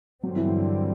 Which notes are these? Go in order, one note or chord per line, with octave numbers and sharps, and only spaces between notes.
G2 D3 F#3 G3 C4
E3
F#3